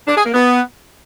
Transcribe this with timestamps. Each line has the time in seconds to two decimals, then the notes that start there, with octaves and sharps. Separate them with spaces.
0.08 D4
0.16 G#4
0.25 A#3
0.34 B3